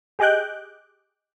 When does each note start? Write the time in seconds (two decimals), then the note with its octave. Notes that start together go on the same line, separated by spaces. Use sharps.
0.19 G4 G#4 D#5 D6 F#6 G6